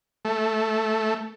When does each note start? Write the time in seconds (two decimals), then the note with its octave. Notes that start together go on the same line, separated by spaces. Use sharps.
0.25 A3